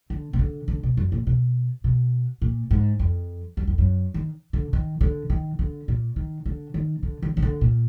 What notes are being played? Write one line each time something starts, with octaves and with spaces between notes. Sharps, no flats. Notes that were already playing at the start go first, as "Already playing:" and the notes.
D3
B2
D3
D3
B2
F#2
A#2
B2
B2
A#2
G#2
F2
F#2
F2
F#2
D#3
D3
D#3
D3
D#3
D3
A#2
D#3
D3
D#3
D3
D#3
D#3
D3
A#2